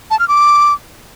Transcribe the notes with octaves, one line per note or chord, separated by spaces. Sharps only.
A5
F6
D6